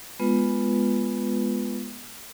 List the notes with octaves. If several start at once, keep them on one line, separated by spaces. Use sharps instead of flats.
G#3 B3 F4 B4